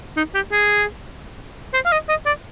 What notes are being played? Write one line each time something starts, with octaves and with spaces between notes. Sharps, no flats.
D#4
G4
G#4
C5
F5
D#5
D#5
D5